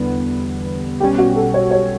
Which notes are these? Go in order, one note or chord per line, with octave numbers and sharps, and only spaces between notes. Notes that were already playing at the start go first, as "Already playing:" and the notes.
Already playing: E2 D3 G3 B3
B1 B2 G3 C#4 G4
F#4
A4
C#5
C#5